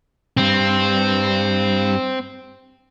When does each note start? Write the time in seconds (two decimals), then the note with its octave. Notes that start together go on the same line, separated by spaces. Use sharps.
0.37 C2 G2 C4